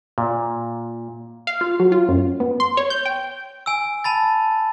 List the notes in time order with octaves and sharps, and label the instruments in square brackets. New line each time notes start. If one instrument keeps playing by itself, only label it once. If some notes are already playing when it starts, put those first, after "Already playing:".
[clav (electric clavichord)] A#2
[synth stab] F5
F4
F#3
F4
F#2
B3
C6
C#5
G6
G5
[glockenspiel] G#5 E6
A5 B5 A6